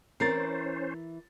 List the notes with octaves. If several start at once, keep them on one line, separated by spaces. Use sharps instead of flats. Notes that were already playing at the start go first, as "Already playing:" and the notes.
E3 C#4 E4 A#4 C5 A6 C7